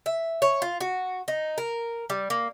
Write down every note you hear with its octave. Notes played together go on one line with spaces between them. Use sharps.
E5
C#5
F4
F#4
D#4
A#4
G3
A#3